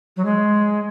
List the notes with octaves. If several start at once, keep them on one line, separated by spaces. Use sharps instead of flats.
F#3
G#3